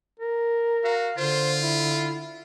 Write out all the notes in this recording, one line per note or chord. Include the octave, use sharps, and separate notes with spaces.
A#4
F#4 F5
D3 F4 C5
E4